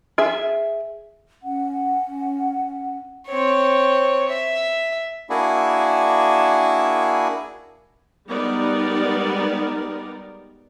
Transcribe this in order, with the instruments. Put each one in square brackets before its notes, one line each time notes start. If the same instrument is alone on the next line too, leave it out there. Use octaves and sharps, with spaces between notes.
[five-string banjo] G#4 E5 G#5
[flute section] C#4 F#5
[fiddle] C4 C#5
E5
[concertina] A#3 D4 E4 F#4 G#4
[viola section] G3 G#3 B3 D#4 A#4 D5